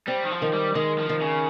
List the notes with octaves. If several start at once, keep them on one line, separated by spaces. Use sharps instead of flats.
G3 C4
D#3
F3
D#3
G3
D#3 G#3
F3
D#3
C#3